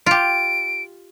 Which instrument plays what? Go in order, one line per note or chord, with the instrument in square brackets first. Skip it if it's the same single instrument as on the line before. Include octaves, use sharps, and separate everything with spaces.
[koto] F4 G4 [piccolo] D7